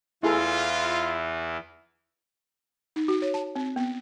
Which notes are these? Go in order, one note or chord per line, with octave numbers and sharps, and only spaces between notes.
E2 E3 E4 F4 G#4 A4
D#4
F#4
C#5
A5
C4
B3